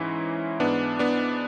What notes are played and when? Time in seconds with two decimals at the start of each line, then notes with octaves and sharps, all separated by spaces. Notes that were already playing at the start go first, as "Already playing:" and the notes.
Already playing: G#2 E3 C#4 E4
0.60 G#2 E3 B3 D4
0.99 B3 D4